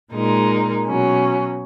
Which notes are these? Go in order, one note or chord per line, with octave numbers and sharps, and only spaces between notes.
A#2 G#3 D#4 A#4
B2 F#3 C#4